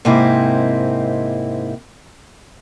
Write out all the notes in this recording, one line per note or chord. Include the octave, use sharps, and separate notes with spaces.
G#2 C3 A#3 C4 D#4 E4